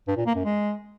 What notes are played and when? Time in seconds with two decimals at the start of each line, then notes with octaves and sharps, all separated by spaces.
0.08 G2
0.17 A#2
0.26 A#3
0.35 F#2
0.45 G#3